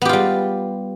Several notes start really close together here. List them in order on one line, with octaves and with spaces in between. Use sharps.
B3 G4 F4 G3